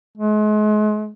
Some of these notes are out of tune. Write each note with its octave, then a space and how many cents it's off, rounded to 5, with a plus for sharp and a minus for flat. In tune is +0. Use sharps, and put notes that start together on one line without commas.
G#3 +40